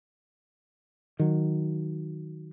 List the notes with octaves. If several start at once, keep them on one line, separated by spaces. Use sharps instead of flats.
D#3 F#3